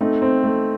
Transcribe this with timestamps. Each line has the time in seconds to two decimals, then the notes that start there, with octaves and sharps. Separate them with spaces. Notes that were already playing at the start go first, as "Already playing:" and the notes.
0.01 A3 C4 D#4
0.22 C4
0.44 A3